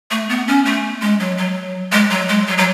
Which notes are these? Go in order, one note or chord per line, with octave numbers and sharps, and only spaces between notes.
A3
B3
C#4
A3
G#3
F#3
F#3
G#3
F#3
G#3
F#3
F#3